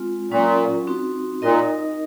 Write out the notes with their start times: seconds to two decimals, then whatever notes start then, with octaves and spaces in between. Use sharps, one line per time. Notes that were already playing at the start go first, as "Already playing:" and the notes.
Already playing: G#3 C4 F4
0.31 A#2 F#3 C#4 F4
0.87 C4 D#4 F#4
1.42 A#2 D#4 A#4 D#5